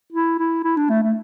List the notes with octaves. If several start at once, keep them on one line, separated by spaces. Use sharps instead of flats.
E4
E4
E4
D4
A3
A3